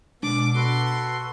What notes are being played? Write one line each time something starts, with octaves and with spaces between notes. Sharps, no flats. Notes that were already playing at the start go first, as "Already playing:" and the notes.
B2 D3 G#3 D4 D6
F#4 A4 B4 C6 D7